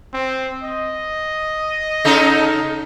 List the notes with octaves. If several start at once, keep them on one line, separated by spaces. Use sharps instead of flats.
C4
D#5
C#3 D#4 A4